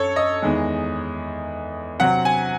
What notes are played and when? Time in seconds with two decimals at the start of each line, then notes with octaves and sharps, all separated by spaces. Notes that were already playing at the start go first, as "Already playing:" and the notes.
Already playing: F#2 A4 C#5
0.16 D#5
0.42 E2 D#3 G#3
2.00 C3 F#3 C4 F#5
2.25 G#5